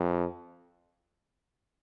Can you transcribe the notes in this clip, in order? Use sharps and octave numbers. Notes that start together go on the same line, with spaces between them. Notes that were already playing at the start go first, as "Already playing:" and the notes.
Already playing: F2